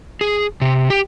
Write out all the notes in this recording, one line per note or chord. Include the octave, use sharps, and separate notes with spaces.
G#4
C3
G4